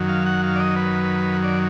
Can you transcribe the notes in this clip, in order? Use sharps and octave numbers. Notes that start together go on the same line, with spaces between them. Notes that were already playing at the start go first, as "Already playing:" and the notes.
Already playing: F#2 D#3 F#3
F5
F#5
F5
D5
D#5
B4
D5